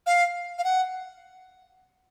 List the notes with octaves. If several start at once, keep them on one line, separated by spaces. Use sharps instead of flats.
F5
F5
F#5